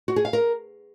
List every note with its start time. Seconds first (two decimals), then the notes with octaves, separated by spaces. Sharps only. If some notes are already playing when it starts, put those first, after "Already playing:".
0.08 F#4
0.16 G#4
0.25 F5
0.33 A#4